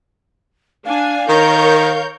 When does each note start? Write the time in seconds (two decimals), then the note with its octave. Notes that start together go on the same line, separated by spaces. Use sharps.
0.85 D4 F5 G#5
1.29 D#3 A#4 C#5 G6